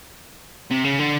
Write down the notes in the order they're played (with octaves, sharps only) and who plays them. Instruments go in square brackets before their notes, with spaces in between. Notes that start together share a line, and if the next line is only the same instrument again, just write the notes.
[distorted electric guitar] C3
C#3
D3